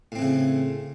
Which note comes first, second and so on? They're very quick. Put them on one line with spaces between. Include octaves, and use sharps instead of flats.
A2 C4 E3 C#3